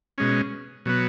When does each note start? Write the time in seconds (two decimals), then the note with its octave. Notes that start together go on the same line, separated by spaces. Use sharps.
0.18 B2 G#3 C#4
0.86 B2 F#3 B3